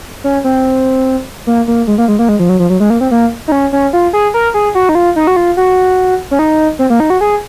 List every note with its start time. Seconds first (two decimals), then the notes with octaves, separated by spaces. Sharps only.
0.24 C#4
0.44 C4
1.47 A#3
1.68 A#3
1.87 G#3
1.98 A#3
2.08 G#3
2.19 A#3
2.29 G#3
2.39 F3
2.49 F#3
2.59 F3
2.70 F#3
2.80 G#3
2.90 A#3
3.01 C4
3.11 A#3
3.48 D#4
3.52 C#4
3.73 C#4
3.93 F4
4.13 G#4
4.34 A#4
4.54 G#4
4.75 F#4
4.89 D#4
4.95 F4
5.16 D#4
5.27 F#4
5.36 F4
5.57 F#4
6.31 C#4
6.39 D#4
6.79 C4
6.90 A#3
7.00 D#4
7.10 F#4
7.21 G#4